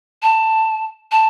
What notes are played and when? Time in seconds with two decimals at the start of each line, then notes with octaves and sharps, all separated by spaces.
0.23 A5
1.12 A5